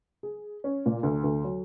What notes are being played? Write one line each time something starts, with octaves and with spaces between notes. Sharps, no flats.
G#4
C#4
A#2
D2
D2
F#3